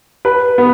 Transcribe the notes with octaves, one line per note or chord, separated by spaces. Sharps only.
B4
B3